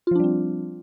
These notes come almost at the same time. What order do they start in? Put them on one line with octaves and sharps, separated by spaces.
F4 F3 D4 G3 C4